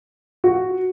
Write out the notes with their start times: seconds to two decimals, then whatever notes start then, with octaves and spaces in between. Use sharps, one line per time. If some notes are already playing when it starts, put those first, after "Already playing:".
0.44 F#4